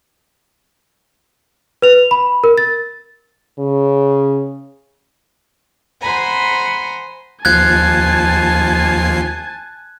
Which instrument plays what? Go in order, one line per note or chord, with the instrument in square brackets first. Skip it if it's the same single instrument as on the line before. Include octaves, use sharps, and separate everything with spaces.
[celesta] B4 F7
B5
A#4
A6
[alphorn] C#3
[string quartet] C5 F#5 G#5 A#5 B5
[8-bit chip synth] D#2 F3 C7 [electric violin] G#5 A5 [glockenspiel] F#6 G#6